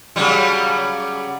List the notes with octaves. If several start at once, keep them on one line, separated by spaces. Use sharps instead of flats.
C#3 F#3 G3